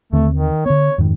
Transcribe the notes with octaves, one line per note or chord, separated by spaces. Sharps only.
D#2 D3 A3 C4
D#3
D3 B3 C#5
F2 G#2 D#3